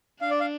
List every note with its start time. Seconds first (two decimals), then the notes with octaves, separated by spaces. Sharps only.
0.21 D4 F5
0.31 D5
0.40 F5